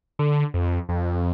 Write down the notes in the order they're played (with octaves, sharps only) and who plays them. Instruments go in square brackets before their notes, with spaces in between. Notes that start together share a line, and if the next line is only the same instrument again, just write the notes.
[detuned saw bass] D3
F2
F2